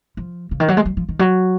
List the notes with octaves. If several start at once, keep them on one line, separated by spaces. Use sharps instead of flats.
F3
C#3
D#3
F#3
G#3
F#3
F3
D#3
F#3